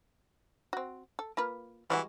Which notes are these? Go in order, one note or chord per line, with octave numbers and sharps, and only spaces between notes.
C4 F#4
A4
A#3 F4 B4
E3 G3 G#3 F#4